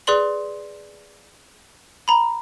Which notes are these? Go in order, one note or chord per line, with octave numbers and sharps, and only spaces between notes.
G#4 B4 D5 C6 F#7
A#5 B5